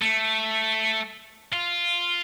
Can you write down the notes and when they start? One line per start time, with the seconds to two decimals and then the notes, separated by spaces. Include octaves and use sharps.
0.02 A3
1.53 F4